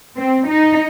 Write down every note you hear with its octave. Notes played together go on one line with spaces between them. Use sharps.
C4
D#4